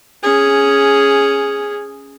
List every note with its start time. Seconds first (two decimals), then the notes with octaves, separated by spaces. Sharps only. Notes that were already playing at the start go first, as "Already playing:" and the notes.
0.23 C#4 G#4